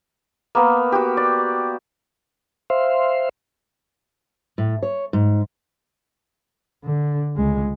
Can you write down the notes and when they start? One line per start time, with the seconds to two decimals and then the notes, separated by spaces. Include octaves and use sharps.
0.55 A#3 B3 A#4
0.92 F#4 G4
1.17 D5
2.70 C5 E5 F5 C6
4.58 A2
4.83 C#5
5.13 G#2
6.84 D3
7.37 C#2 G#3